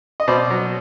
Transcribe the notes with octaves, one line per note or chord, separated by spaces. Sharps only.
D#5
B2 C5 D5
F#3